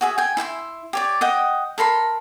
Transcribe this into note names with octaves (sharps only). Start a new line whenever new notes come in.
F#4 G#4 E5
G5 G#5
E4 E5 G5 C6
G4 C#5 D5
D#5 F#5 G5
A4 A#4 B5 C6